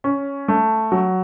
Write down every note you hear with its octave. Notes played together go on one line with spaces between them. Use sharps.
C#4
A3
F#3